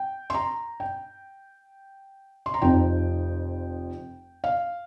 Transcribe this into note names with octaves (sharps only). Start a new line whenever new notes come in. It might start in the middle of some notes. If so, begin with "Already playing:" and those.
Already playing: G5
C6
A#5
G5
C6
A#5
F1 F2 F3 C4 D#4 G5
F5